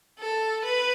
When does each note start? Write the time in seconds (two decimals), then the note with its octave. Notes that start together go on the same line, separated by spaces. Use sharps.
0.19 A4
0.65 B4